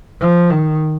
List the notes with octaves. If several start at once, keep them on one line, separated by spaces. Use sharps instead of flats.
F3
D#3